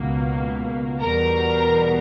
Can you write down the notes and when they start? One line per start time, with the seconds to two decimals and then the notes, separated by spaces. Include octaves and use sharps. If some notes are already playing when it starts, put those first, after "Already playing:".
Already playing: C#2 B2 A#3
1.02 E2 B2 G3 A#4 A#5